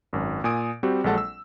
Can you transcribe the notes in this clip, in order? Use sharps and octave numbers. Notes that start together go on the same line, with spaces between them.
G#1 F#2
A#2 G#5 D#6 D7
G3 C4 F#4 G4
A#1 F#3 G#3 A4 F#5 A5
E6